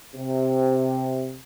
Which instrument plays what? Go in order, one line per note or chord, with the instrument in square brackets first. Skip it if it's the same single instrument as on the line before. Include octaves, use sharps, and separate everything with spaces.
[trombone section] C3